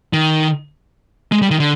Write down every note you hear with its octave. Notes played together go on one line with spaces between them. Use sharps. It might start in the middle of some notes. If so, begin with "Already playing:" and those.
D#3
G#3
G3
D#3
D3